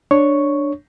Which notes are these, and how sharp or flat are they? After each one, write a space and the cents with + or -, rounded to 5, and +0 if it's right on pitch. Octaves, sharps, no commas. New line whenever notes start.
D4 +0 C#5 +0 C#6 +0